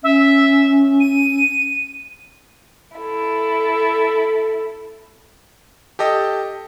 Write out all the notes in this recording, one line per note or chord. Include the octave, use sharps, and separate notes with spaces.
C#4 E5
D#7
E4 A4
G4 A4 D#5